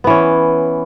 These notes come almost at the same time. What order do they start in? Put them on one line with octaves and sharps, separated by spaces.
B3 E3 C#4